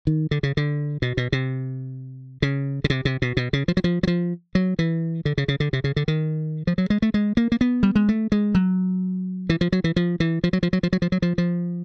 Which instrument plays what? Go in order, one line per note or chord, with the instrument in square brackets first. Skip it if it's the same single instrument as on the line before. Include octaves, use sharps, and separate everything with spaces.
[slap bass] D#3
D3
C#3
D3
B2
B2
C3
C#3
C#3
C3
C3
B2
B2
C#3
F3
F#3
F3
F#3
F3
F#3
E3
D3
C#3
C#3
D3
C3
C#3
D3
D#3
F3
F#3
G#3
A3
G#3
A#3
A#3
B3
G3
G#3
A3
G#3
F#3
E3
F3
F#3
E3
F3
E3
F3
F#3
F3
F#3
F3
F#3
F3
F#3
F3
F3